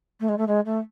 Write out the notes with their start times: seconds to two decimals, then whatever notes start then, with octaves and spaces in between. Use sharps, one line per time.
0.20 A3
0.28 G#3
0.38 A3
0.47 G#3
0.65 A3